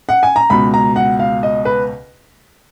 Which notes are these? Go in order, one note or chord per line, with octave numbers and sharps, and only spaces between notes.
F#5
G#5
A#5
C#2 B2 B5
A#5
F#5
F5
D#5
B4